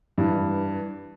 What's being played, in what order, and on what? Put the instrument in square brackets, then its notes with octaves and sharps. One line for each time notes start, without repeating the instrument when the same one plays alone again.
[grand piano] G2 E3